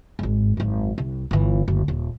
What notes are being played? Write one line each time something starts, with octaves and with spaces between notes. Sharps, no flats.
G#1 G#2
G#1 F#2
C2
G1 E3
F#1 D2
D#1